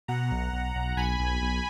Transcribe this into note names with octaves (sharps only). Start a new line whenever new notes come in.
B2 F#5 A#5
B1
B1
B1
B1 G#5 B5
B1
B1